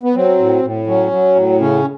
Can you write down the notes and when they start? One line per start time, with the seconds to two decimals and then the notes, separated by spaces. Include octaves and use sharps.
0.03 B3
0.15 F#3 C4
0.39 A2
0.62 A2
0.87 F#3 C#4
1.11 F#3
1.35 A2
1.60 C#3 C#4